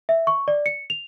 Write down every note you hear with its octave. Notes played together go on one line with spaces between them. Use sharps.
E5
C#6
D5
C#7
F7